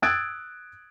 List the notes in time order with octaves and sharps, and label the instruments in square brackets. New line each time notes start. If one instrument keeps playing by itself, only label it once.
[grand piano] D#6 E6 F#6 G#6 A6 D7